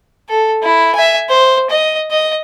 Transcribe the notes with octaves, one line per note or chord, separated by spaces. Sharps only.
A4
E4
E5 G#5
C5
D#5
D#5